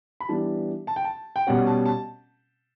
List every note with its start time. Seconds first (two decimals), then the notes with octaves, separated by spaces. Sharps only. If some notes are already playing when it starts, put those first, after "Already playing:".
0.20 B5
0.29 E3 G3 B3 D4 A5
0.87 A5
0.96 G5
1.04 A5
1.36 G5
1.47 B2 G3 C#4 F#5
1.67 A5
1.85 A5